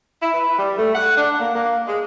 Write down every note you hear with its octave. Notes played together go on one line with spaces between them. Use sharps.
E4
B4
G3
A3
F#5
D4
A#3
A#3
G#3